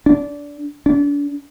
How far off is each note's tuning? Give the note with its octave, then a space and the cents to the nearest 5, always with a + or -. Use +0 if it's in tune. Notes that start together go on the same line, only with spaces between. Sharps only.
D4 -20
D4 -35